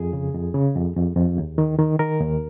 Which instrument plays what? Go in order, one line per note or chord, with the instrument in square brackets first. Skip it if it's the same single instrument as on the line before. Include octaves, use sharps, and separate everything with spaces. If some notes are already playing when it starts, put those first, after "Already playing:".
Already playing: [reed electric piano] F2 G#4
C#3
F2
C#3
F2
F2
F2
D#2
D#3
D#3
D#3 A#4
D#2